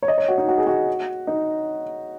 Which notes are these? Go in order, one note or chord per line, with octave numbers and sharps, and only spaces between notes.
C#5
D#5
C#5
F#4
D#4
F#4
G#4
F#4
D#4